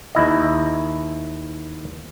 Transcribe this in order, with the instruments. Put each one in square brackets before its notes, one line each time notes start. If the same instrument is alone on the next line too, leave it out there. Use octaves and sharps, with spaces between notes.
[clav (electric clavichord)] D#2 E4 D#5